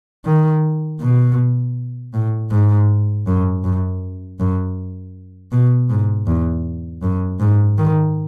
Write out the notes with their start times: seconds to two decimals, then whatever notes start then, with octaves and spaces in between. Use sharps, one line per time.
0.25 D#3
1.01 B2
2.14 A2
2.51 G#2
3.27 F#2
3.64 F#2
4.40 F#2
5.52 B2
5.90 G#2
6.27 E2
7.03 F#2
7.40 G#2
7.78 D#3